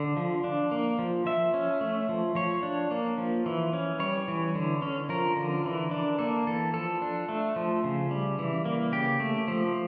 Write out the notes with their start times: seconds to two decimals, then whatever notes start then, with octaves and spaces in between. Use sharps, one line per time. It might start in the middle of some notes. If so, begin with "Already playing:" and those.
Already playing: D3
0.17 F3
0.44 D4
0.71 A#3
0.99 F3
1.26 F3 E5
1.54 C#4
1.81 A3
2.09 F3
2.35 F3 C#5
2.63 D4
2.91 A#3
3.18 F3
3.46 E3
3.73 C#4
4.00 G3 C#5
4.28 E3
4.55 D3
4.82 C#4
5.09 F3 A#4
5.36 D3
5.65 E3
5.91 D4
6.19 A#3 A4
6.47 E3 A4
6.73 F3 A4
7.02 D4
7.29 A3
7.56 F3
7.84 C#3
8.11 G3
8.39 E3
8.65 A#3
8.92 C#3 G4
9.20 A3
9.48 F3